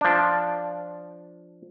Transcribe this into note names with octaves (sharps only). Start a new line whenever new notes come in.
F3 D4